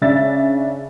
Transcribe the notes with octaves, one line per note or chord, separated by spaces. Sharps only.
C#3 D4 E5 A6